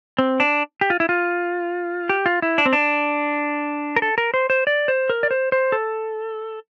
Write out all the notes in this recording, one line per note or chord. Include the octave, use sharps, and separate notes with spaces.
C4
D4
G4
F4
E4
F4
G4
F4
E4
D4
C4
D4
A#4
A4
A#4
C5
C5
D5
C5
A#4
D5
C5
C5
A4